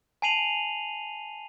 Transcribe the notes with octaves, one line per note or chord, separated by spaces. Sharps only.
G#5 A5 C7 D#7 F7 F#7